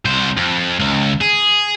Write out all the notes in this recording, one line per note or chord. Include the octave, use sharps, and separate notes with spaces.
C2 C5
F2
C#2
G#4